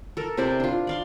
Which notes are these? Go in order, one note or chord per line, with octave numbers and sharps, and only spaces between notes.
A4 A#4
C3 E4 C5 D5
D4 F4
D5 F5 C6